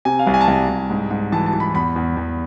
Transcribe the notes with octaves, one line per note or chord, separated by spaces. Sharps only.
C3 G#5
F5
C2
G#5
A5
C2 G#5
C2
G#2
G#2
E3 A5
A5
E3
B5
E2 B5
E2
E2